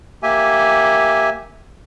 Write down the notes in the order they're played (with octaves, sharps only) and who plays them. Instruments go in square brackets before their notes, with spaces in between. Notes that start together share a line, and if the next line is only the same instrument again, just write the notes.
[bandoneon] A#3 G4 E5 G#5